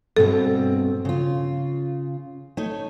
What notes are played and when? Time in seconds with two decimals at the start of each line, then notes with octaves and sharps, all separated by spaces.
0.17 G2 B2 C4 A4
1.05 C#3 F4
2.57 A3 D#4 C#5